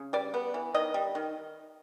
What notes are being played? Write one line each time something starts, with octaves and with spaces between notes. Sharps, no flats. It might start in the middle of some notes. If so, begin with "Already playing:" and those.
Already playing: C#3
G3 D5
B3
E3
D#3 D#5
G3
D#3